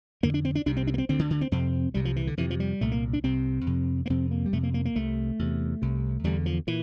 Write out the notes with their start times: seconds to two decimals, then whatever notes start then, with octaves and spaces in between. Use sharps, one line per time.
0.23 F2 D3 A#3
0.34 D4
0.45 C4
0.55 D4
0.66 C2 C3 D4
0.77 C4
0.87 D4
0.94 A#3
0.98 C4
1.09 D2 D3 C4
1.19 D3
1.30 D3
1.41 C4
1.52 F2 C3 C4
1.94 C2 C3 G3
2.05 F3
2.16 E3
2.27 D3
2.37 F2 C3 E3
2.51 F3
2.60 G3
2.81 C2 A#2 A3
2.92 A#3
3.13 D4
3.24 C2 C3 C4
3.66 F2 C3
4.06 A#3
4.10 F2 C3 C4
4.31 A#3
4.46 G3
4.52 F2 C3 A3
4.63 A#3
4.74 A#3
4.85 A#3
4.96 C2 C3 A3
5.39 E2 C3
5.82 C2 C3
6.24 E2 D3 G3
6.46 F3
6.67 A#2 E3